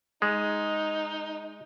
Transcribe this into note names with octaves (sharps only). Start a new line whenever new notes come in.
G#3 D#4